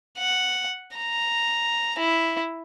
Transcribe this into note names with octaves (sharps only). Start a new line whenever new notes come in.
F#5
A#5
E4